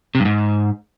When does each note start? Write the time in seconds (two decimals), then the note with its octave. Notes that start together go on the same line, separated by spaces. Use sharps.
0.15 C3
0.20 G2
0.25 G#2